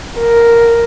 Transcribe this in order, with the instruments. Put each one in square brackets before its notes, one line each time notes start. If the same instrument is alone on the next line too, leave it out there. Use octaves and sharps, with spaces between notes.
[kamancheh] A#4